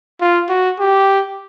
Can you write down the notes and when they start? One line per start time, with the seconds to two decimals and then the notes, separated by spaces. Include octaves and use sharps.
0.21 F4
0.50 F#4
0.80 G4